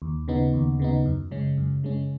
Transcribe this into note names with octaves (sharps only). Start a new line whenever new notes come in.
D#2
C#3 B3 D#4
D#2
C#3 B3 D#4
F#2
C#3 G#3 C#4
F#2
C#3 G#3 C#4